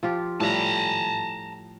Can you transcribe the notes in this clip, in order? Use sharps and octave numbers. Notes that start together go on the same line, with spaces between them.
F3 F4 G4
A2 F3 G3 A5 A#5